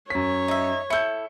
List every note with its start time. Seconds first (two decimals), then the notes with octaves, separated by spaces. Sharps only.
0.10 F#2 C#5 B6
0.48 D#4 E5
0.90 E4 A4 G6 C#7